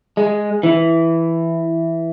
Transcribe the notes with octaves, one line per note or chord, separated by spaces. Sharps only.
G#3
E3